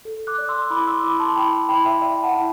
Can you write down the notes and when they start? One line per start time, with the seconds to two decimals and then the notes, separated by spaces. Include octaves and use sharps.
0.05 A4
0.27 D6 F#6
0.38 D5
0.48 C6 E6
0.70 E4 B5 D6
0.87 C6 E6
1.03 E4 B5 D6
1.20 A5 C6
1.36 E4 G5 B5
1.69 E4 G5 B5
1.85 E5 G5
2.01 D5 E5 G5
2.23 F#5 A5
2.34 E4